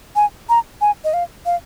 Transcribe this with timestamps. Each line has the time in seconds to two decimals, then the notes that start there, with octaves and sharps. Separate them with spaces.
0.16 G#5
0.49 A#5
0.81 G#5
1.04 D#5
1.14 F5
1.46 F5